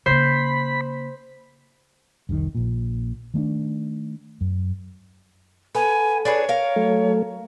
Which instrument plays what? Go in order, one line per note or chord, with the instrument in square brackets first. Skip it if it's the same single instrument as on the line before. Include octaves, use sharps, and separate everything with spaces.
[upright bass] C#3 A#3 [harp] C5 [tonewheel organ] B5
[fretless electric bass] F1 C2 C3 D#3
A#1 A#2
D#3 A3 B3 D4
F#2
[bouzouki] B3 [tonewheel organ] A4 [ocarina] G#5
[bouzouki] D4 G#4 B4 [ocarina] C#5
[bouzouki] A#4 F5
[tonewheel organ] F#3 A3 A4